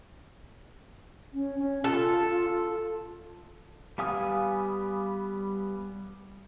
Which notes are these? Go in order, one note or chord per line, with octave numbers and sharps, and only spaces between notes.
C#4
C#4
F4 A4
G3 B3 F5 G#5 D#6